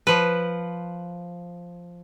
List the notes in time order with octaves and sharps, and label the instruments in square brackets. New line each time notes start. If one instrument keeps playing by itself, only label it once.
[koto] F3 B4